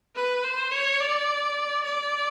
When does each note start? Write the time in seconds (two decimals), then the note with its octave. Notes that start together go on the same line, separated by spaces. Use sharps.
0.16 B4
0.44 C5
0.72 C#5
1.00 D5
1.85 D5